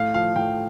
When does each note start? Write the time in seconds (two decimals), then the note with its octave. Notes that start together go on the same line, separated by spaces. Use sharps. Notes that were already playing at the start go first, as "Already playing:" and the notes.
Already playing: A2 F5
0.14 F3 F5
0.36 A2 G5